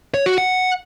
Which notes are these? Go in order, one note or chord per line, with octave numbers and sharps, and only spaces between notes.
C#5
F#4
F#5